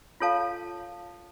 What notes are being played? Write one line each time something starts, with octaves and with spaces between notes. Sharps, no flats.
F4 A4 C#5 F5 A5